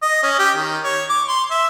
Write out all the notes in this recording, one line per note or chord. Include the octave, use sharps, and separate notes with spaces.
D#5
C#4
G4
D#3
C#5
D6
C6
E5